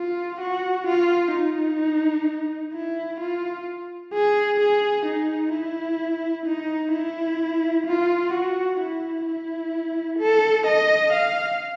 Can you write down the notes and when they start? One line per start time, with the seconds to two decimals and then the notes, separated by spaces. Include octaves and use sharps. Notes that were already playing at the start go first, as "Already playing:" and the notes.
Already playing: F4
0.41 F#4
0.87 F4
1.33 D#4
2.73 E4
3.21 F4
4.14 G#4
4.60 G#4
5.06 D#4
5.53 E4
6.46 D#4
6.94 E4
7.87 F4
8.33 F#4
8.80 E4
9.26 E4
10.19 A4
10.67 D#5
11.13 F5